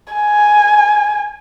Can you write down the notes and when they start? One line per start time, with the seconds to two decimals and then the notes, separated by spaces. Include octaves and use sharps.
0.13 G#5